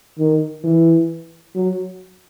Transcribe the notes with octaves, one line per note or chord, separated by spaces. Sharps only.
D#3
E3
F#3